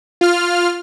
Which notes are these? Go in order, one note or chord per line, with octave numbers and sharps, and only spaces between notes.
F4 F6